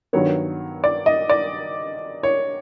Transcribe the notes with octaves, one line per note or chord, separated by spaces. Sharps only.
G2 D#3 F#3 B3 C#5
D5
D#5
D5
C#5